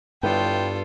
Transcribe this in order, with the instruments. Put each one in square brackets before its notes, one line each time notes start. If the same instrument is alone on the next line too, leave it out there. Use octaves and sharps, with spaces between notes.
[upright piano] G1 E4 B4 [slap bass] G2 [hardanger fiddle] F4 A4 [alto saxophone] G5